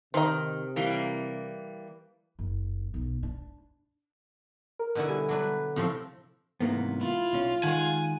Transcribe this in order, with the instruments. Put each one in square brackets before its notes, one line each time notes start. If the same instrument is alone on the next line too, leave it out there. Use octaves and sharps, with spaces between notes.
[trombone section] C3 [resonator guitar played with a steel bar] D#3 [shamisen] C4 D#4
[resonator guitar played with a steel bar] E3 G3 A#3
[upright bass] F#1
B1
D4
[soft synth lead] A#4
[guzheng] B2 D3 E4
[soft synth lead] G3 [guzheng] G#5
[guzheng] F#3 D4 B4
[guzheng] A2 F3 C4 [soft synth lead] C3
[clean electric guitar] G#2 C3 [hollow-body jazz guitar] E3 A#3 B3
[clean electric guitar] E4 [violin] F4
[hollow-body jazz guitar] B1 C#4
[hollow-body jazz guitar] D#3 G#3 [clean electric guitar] F#5 [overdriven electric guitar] G#5